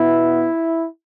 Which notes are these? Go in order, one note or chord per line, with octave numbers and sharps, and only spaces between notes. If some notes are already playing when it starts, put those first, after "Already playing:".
Already playing: B2 B3 E4